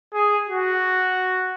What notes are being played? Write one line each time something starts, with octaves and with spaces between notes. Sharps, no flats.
G#4
F#4